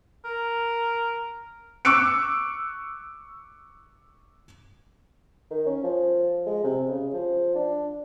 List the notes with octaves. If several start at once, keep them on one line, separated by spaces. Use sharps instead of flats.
A#4
C#6 D6 E6 F#6 C#7 D7
D#3
C#4
F3
G#3
C3
C#3
F3
D4